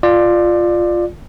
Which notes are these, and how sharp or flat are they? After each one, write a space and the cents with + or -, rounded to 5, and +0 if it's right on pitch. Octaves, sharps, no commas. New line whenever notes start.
F4 +0 D5 +20